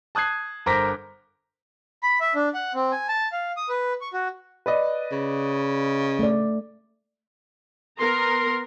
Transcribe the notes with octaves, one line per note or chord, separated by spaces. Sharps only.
A5 D#6 F#6 G#6 C7
G1 A#4 C5 D6 A#6 B6
B5
E5
D4
F#5
C4
G#5
A5
F5
D#6
B4
C#6
F#4
B4 D5 D#5
C#3
A3 D5
B3 A#4 A#5 C6